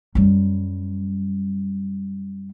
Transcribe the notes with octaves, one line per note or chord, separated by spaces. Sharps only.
F#2 G3